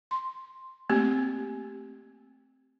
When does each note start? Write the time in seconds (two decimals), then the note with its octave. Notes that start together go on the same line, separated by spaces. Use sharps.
0.11 C6
0.89 A3 A#3 C4 G4